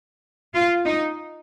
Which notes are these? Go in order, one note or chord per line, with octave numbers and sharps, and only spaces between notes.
F4
D#4